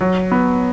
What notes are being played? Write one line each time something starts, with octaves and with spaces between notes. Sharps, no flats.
F#3
B3